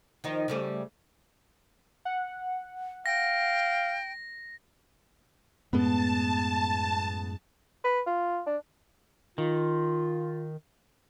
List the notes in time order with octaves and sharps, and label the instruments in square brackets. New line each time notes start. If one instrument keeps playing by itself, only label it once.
[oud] D#3 F3 D#4
C#3 G3 A3
[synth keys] F#5
[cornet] F5 [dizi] G5 [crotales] A#6
[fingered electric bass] F#2 A2 G#3 [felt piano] B3 [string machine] A5
[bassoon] B4
F4
D4
[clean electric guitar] D#3 [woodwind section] F4